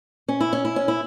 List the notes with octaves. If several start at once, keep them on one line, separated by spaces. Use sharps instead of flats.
C#4
E4
C#4
E4
C#4
E4